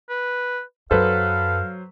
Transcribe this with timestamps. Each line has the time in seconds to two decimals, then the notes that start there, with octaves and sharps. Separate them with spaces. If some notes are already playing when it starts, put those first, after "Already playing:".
0.09 B4
0.91 F#2 F#3 A4 B4 C5 F5